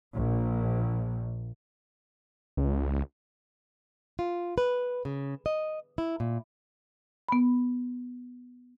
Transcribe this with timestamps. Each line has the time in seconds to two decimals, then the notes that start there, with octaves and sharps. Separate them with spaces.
0.17 A#1
2.57 C#2
4.19 F4
4.58 B4
5.05 C#3
5.46 D#5
5.98 E4
6.20 A#2
7.29 B3 B5